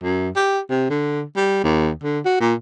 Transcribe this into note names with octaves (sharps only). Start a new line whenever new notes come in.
F#2
G4
C3
D3
G3
D#2
D3
F#4
A#2